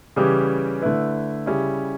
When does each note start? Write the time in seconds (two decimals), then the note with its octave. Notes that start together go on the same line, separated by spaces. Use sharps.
0.16 C#3 E3 G3 C#4 G4
0.81 D3 A3 E4 B4
1.46 C#3 G3 C#4 E4